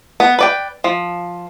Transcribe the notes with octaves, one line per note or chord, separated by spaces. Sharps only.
B3
B4 D5 G5
F3